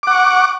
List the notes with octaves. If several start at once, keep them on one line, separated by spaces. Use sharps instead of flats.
F#5 C#6 D6